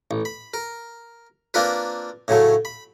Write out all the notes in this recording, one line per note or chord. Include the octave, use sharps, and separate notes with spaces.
A1
B5
A#4
A#3 C4 D4 F4 A#4 B4
A2 C#3 F#3 A3
B5